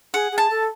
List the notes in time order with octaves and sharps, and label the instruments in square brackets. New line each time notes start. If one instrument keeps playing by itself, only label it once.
[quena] G#4 [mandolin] F#5
[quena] G#4
[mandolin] A5
[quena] A4